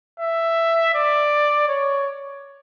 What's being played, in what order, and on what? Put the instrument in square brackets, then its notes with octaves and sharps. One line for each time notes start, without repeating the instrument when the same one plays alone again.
[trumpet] E5
D5
C#5